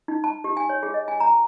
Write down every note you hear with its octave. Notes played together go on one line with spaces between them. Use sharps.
D#4
A5
G4
G#5
C#5
G#4
D#5
G#5
A#5